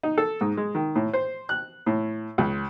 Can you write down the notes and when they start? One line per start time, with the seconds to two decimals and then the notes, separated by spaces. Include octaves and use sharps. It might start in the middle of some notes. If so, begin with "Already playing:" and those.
0.03 D#4
0.18 A4
0.41 G#2
0.57 G#3
0.75 D#3
0.96 A2
1.13 C5
1.49 F#6
1.86 A2
2.38 C#2